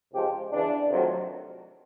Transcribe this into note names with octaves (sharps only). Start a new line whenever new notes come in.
C#2 C3 F3 G#3 G4
E2 C#3 E3 D4
F2 C3 D#3 F#3 A3